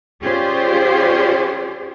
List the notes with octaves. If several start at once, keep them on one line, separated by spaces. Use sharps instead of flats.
C#4 F4 G4 G#4 C5 D5